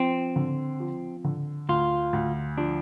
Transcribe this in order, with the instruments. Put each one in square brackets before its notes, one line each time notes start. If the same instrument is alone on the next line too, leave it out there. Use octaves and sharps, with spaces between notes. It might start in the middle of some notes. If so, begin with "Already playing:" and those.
Already playing: [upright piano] F3 [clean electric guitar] C4
[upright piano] D3
F3
D3
[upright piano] D2 [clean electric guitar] F4
[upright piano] D2
[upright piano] F3 [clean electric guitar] D4